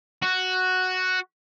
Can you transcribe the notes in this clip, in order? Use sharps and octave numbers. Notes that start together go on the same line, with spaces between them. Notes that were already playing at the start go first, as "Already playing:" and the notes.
F#4